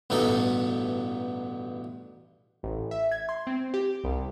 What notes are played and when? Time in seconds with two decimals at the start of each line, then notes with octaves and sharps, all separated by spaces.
0.10 A1 G2 B2 D#4 A4
2.63 A1
2.91 E5
3.12 G#6
3.29 C6
3.47 C4
3.74 G4
4.04 C2